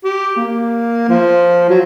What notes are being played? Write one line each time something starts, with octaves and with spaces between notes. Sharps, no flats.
G4
A#3
F3
F#3